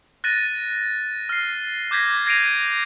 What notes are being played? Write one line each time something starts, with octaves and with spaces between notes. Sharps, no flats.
F#6 A6 A#6 D#7
F6 C7
D6 G6 G#6 A#6 B6
G#6 A#6 C7 D7 D#7 F7